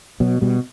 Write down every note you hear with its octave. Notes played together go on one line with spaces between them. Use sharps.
B2 F#3
B2 G3